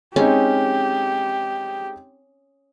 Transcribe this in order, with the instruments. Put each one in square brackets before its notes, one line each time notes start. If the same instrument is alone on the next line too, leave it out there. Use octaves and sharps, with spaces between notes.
[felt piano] G#3 C4 D#4 [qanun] C#4 [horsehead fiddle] G4